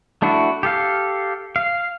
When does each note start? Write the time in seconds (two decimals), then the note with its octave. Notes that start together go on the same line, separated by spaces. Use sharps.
0.22 A3 D4 E4 F#4
0.63 G4 A4 F5
1.56 F5